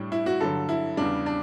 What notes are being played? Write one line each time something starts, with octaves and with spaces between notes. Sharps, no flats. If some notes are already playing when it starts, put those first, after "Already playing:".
Already playing: A2 G3 D4
E4
F#4
G2 D3 F#3 A4
E4
E2 C#3 G3 D4
D4